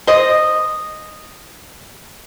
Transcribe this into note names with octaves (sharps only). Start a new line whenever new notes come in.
C5 D#5